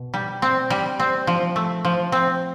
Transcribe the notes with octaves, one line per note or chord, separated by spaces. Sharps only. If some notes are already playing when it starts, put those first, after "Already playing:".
Already playing: B2
G3
C4
G3
C4
F3
A3
F3
C4